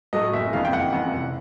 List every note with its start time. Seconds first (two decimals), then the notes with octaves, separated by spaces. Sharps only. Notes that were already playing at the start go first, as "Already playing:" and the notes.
0.13 A2 F#3 A3 D#5
0.33 F#1 E5
0.53 F2 C#3 E3 F5
0.65 G5
0.72 F#1 F#5
0.92 F2 C#3 E3
1.13 F1